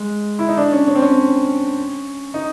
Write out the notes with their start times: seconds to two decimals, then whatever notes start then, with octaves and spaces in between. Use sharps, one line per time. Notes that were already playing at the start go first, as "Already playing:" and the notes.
Already playing: G#3
0.39 E4
0.48 D#4
0.57 D4
0.72 C#4
0.87 C#4
0.95 C4
1.02 C#4
2.34 D#4